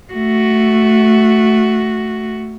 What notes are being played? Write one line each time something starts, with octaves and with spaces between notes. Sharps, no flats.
A3 F#4